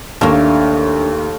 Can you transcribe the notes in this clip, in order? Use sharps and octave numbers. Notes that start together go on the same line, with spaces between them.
D#2 A3 A#3 D4 C#5 F5